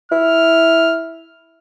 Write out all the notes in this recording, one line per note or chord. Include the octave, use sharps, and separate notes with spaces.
E4 F6